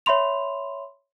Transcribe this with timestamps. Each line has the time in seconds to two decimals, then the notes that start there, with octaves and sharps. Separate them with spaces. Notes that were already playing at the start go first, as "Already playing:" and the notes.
0.06 C#5 E5 B5 C6 F7